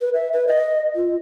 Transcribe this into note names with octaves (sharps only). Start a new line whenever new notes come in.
B4
E5
B4
D#5
F4